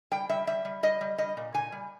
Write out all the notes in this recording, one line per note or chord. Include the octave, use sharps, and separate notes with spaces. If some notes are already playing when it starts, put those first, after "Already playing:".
G3 G5
G3 E5
G3 E5
G3
G3 D#5
G3
G3 D#5
A#2
A#2 G#5
G3